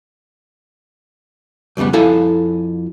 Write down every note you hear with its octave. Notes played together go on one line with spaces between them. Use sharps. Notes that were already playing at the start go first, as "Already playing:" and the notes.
B1 F2 C#3 G3 B3
F2 E4 A4 F5 G#5